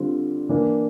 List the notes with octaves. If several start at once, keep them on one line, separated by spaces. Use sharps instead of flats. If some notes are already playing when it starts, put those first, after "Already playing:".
Already playing: D3 G3 C4 F4
E3 A#3 D4